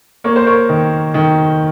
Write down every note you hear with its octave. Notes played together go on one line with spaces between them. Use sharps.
A#3 C#5
C5
A#4 C#5
D#3
D#3